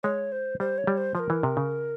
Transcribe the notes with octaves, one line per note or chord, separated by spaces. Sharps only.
G#3 C#5
C5
G3 C5
C#5
G3
C5
F3 A#4 C5
E3
C3
C#3